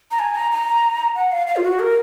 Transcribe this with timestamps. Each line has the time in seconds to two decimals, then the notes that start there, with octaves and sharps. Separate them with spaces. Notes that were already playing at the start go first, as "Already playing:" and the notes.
0.11 A#5
0.19 G#5
0.35 A#5
0.51 A#5
1.15 F#5
1.32 F5
1.47 F5
1.56 F4
1.64 F#4
1.80 A#4